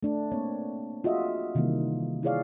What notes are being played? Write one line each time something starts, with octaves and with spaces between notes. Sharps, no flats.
A3 D4
A#3 C4 C#5
F4 F#4 G#4 D#5 E5
C3 D#3 E3 G3 A#3
E4 F4 G#4 C#5 D5 F5